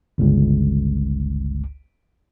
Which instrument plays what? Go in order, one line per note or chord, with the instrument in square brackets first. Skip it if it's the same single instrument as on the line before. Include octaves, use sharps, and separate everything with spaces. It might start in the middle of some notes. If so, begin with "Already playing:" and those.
[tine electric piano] G1 C#2